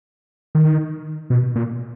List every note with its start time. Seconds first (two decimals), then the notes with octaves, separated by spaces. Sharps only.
0.55 D#3
1.30 B2
1.56 A#2